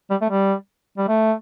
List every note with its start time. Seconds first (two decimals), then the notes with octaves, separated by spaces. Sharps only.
0.10 G3
0.22 A3
0.30 G3
0.98 G3
1.08 A3